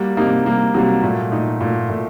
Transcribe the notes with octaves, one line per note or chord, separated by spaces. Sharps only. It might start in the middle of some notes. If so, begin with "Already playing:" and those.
Already playing: G3 A#3 F#4
C3 G3 A#3 D#4
C3 G3 A#3
C3 F#3 G3 A#3 F#4
A#2 A3
A#2 A3 D#4
A#2 A3
A#2 A3